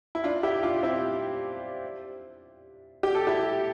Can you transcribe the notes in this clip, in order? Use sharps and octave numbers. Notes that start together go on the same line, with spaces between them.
E4
D4 F4
E4 G4
D4 F4
C4 E4
G4
A4
E4 G4